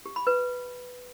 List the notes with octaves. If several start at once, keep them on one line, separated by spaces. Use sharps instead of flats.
G4
B5
B4